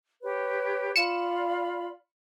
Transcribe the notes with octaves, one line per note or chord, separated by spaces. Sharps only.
G4 B4 C#5
F4 D5 B5 C#7 E7